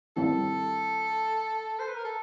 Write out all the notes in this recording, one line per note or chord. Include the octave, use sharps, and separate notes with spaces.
D#3 G3 C4 E4 A4
C5
B4
A#4
A4